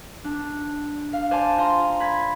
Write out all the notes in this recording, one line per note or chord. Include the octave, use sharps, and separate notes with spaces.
D4
F5
C5 D5 F5 G#5 A5
F4 F5 A#5 C6
B5 G#6 A6 B6